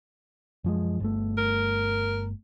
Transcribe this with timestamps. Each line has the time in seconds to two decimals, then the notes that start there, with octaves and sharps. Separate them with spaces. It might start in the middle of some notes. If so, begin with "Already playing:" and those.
0.64 F#2 F3 G#3
1.00 G1 A3
1.38 A#4